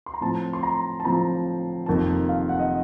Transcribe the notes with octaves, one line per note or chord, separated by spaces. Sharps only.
C6
A#5
A2 F3 C4 A5
C6
A#5
A5
A2 F3 C4 A#5
F1 F2 D#3 A#3 A5
F5
F#5
D#5